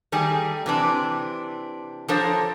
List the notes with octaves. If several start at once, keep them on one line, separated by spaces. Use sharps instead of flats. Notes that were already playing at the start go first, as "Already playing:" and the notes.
D#3 G3 A3 G#4
C3 E3 D4
F3 D4 A4 A#4 C5 C#5